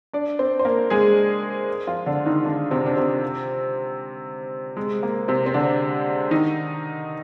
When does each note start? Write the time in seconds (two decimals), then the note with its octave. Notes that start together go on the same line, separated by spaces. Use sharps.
0.13 D4 D5
0.39 C4 C5
0.59 C5
0.65 A#3 A#4
0.90 G#3 G#4
1.87 F3 F4
2.06 D3 D4
2.26 D#3 D#4
2.45 D3 D4
2.71 C3 C4
2.86 D4
2.97 C3 C4
4.77 G#3
5.03 A#3
5.28 C3 C4
5.46 C4
5.54 D3 D4
6.31 D#3 D#4